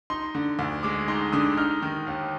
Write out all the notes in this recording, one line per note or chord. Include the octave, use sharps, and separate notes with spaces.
D#4 C6
D3
D2
G#3 D6
D#4 C6
D3 D#6
D#4 F6
D#3
D#2